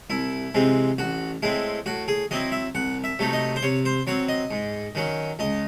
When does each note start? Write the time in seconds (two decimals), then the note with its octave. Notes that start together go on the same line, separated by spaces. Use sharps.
0.10 C2 E4
0.54 C3 E3 G#3 C4
0.98 A1 F#4
1.43 A2 G#3 C4 E4
1.86 A2 F#4
2.08 G#4
2.31 F#3 C4 E4 D#5
2.52 E5
2.75 C2 F#5
3.04 E5
3.19 C3 F#3 A3 D#4
3.33 D#5
3.56 C5
3.63 C3 C#5
3.85 C5
4.07 F#3 C4 C#5
4.29 D#5
4.51 G#2
4.95 D#3 F#3 C#4
5.39 C#2 D#5